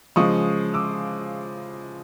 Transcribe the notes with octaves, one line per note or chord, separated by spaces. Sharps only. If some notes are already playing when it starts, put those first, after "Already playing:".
C#3 F3 G#3 C#6 D#6
D6 E6